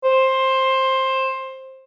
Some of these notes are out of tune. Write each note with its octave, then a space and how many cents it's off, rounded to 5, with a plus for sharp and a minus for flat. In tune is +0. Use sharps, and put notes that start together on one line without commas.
C5 +15